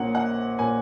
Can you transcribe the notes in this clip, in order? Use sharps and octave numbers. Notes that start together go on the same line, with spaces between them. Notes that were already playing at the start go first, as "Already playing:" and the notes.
Already playing: A#1 A#2 A#3 C#4 F#5
F#5
A#2 A#3 C#4 G#5